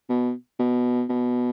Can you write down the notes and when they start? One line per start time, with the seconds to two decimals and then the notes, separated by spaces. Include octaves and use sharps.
0.09 B2
0.59 B2
1.09 B2